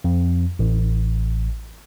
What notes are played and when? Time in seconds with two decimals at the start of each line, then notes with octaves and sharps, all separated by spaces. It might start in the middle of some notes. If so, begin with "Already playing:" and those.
0.04 F2
0.59 A1